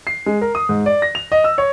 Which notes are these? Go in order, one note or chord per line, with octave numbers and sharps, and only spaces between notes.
C7
G#3
A#4
D#6
G#2
D5
A#6
F7
D#5
E6
C#5